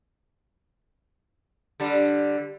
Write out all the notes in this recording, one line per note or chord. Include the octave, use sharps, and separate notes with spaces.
D3 G3